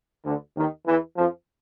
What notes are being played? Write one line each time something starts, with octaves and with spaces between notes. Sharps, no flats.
D2 D3
D#2 D#3
E2 E3
F2 F3